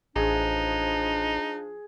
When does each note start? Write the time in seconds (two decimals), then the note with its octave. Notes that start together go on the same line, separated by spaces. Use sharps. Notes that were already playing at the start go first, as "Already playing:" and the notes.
0.16 A1 F3 D4 D#4 G#4